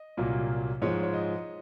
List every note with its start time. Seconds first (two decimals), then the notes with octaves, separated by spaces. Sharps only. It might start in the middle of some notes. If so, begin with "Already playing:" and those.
Already playing: D#5
0.17 C2 A#2 F#3 A#3
0.82 G#2 F3 G#3 C#5
1.03 C#5
1.13 D#5